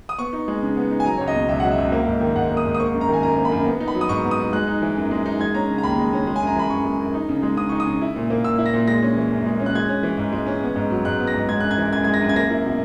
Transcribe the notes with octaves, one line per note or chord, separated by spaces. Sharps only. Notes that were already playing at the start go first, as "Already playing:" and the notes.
D#6
B3 C#6
D#4
G#3
C#3
B3
D#4
G#5
F#3 A#5
C#2 C#5
D#5
B2
C#2 E5
F#3 F#5
E5
C#2
A#3
G#2
D#3
G#2 F#5
A#3
D#6
G#2
D#6
A#3 C#6
F#2
A#5
D#3 G#5
F#2 A#5
A#3
B5
F#2
B3
D#4
B5
F#3
D#6
G#2 C#6
B3
D#6
D#4
G#3 F#6
D#4
E3
F#2
G#3
D#4
G#3 G#6
C#4 A#5
C#3
A#5
D#2 B5
G#3
C#4
G#3
G#5
F#2 A#5
E3 B5
F#2 C#6
G#3
F#2
D#4
C#3
G#3
C#3 D#6
D#4 C#6
D#6
C#3
E4
A#2
A#3
A#2 E6
E4
A#6
A#2
G#3 A#6
C#4
E3
F#2
G#3
C#4
F#6
G#3 G#6
C#4
E3
G#2
G#3
C#4
B3
G#2
F#3
G#2 F#6
B3
A#6
G#2
G#3 G#6
F#2 F#6
G#6
E3
F#2 G#6
G#3 G#6
A#6
F#2
G#6
A#3 A#6
E4
B2